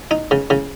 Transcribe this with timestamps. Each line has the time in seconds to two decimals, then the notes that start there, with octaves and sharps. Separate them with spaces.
0.11 D#4
0.31 C#3
0.50 C#3